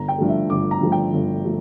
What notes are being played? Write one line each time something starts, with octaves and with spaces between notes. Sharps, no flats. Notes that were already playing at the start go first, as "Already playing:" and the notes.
Already playing: G1 A#5
G5
G2 F3 A3
E5
G1 D6
A#5
G2 F3 A3
G5
G1
F3 A3